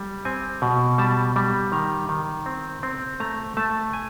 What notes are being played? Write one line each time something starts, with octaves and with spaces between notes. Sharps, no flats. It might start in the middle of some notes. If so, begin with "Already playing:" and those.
Already playing: G3
C4 G#5
B2
G3 A5
G3
D#3 A#5
D#3
C4
C4
A3 A#5
A3 A5
G#5